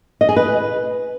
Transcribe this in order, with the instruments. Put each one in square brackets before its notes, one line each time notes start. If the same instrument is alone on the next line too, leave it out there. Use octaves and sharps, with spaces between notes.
[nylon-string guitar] D#5
G#4
B4